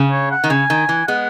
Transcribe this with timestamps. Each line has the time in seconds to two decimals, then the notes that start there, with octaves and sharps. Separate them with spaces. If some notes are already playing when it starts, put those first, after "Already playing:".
Already playing: C#3
0.11 C#5
0.31 F#5
0.44 D#3
0.50 C#3 G#5
0.70 D#3
0.89 E3
1.08 G#3 B3 F#5